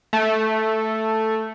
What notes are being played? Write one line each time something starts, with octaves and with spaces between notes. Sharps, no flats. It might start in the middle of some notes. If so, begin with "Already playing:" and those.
A3